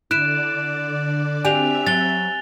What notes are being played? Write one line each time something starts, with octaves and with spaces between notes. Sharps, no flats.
D3 E4 D5 F#6 D7 E7
C4 D4 F#4 G4 E5 G#5 F7
F#3 A6 G7